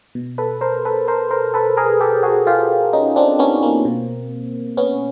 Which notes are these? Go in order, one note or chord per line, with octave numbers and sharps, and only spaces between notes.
B2
A4 B4
A#4 C5
A4 B4
A#4 C5
A#4 C5
A4 B4
G#4 A#4
G4 A4
F#4 G#4
F4 G4
C#4 D#4
C4 D4
B3 C#4
A#3 C4
B2
B3 C#4